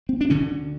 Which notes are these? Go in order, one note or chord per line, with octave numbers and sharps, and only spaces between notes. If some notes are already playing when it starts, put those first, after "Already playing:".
C4
D4
D2 D3 C#4